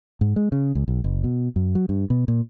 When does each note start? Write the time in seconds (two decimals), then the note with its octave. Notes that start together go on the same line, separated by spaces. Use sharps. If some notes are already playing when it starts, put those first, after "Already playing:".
0.21 G#2
0.36 G#3
0.52 C#3
0.75 C#2
0.88 B1
1.04 F#1
1.24 B2
1.56 F#2
1.75 F#3
1.89 G2
2.10 B2
2.28 A#2